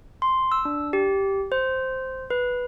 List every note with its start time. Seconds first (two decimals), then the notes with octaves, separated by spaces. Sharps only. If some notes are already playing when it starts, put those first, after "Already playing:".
0.22 C6
0.52 E6
0.65 D4
0.93 G4
1.52 C5
2.30 B4